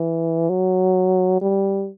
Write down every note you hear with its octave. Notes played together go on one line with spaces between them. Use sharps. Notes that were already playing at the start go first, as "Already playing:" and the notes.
Already playing: E3
F#3
G3